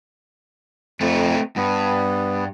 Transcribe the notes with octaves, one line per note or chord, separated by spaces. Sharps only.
F2 A3 C4
G2 B3